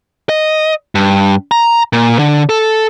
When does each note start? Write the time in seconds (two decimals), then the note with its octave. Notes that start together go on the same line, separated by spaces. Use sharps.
0.29 D#5
0.95 G2
1.51 A#5
1.93 A#2
2.19 D3
2.49 A4